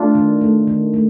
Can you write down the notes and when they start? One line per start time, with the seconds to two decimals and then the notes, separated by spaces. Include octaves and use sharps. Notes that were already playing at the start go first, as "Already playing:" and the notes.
Already playing: A3 D4 F4
0.15 D#3
0.41 A3
0.67 D#3
0.94 A3